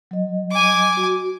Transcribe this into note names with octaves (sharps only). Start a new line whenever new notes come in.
F#3 D#5
G#5 D6
F#4